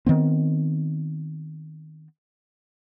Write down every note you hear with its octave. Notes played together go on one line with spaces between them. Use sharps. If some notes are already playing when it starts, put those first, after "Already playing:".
D#3 B3 C4